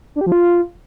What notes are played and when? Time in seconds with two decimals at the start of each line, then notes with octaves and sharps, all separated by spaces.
0.16 D4
0.21 G4
0.26 F3
0.32 F4